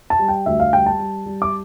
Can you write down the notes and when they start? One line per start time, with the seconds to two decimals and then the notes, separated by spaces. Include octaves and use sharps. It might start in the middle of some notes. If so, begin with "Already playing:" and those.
0.10 A5
0.19 G3
0.28 G5
0.46 D2 E5
0.60 F5
0.73 G3 G5
0.86 A5
0.99 G3
1.26 G3
1.42 D6